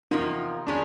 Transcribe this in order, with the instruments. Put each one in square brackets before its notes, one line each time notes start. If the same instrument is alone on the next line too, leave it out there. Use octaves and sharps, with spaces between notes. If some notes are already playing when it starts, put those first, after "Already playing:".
[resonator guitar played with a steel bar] E2 C3 F3 A#3 [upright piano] D#4
[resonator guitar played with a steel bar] D#3 G#3 C#4 [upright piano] D4